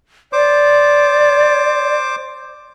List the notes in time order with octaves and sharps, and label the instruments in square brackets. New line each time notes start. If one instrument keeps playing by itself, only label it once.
[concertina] C5 D6 [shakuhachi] D5